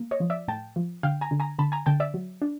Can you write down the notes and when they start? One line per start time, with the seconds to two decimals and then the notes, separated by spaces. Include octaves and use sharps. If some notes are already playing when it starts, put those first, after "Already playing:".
Already playing: A#3
0.11 C#5 D#5
0.20 F3
0.30 D5 E5
0.48 A2 G5 A5
0.76 F3
1.03 D3 F5 G5
1.21 G#5 A#5
1.31 D3
1.40 G#5 A#5
1.59 D3 A5 B5
1.72 G#5 A#5
1.86 D3 G5 A5
2.00 D5 E5
2.14 F#3
2.42 D4